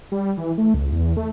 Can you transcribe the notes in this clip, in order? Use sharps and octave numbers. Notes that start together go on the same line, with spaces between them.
G3
E3
A3
C#2
E2
A3